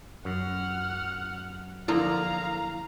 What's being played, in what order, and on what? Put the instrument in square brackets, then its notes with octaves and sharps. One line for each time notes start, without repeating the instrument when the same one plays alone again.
[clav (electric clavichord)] F#2 [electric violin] F#5 F6
[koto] D3 F3 A#3 [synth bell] E4 [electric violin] F5 A#5